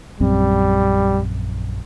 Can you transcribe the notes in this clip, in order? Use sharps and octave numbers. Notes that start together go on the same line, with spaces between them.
A#1 F#2 G3 C4